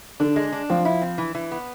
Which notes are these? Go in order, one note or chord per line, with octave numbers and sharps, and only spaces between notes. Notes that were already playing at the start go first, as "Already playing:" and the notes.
D3 D4
G#3
D4
F3 C4
E4
C4
E3
E3
B3